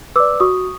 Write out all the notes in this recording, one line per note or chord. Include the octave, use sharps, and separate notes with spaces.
B4 D5 D6 E6
F#4 C#6 D#6